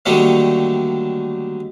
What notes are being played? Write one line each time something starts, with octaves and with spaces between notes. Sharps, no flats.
D3 D#3 F#3 G3 A3 A#3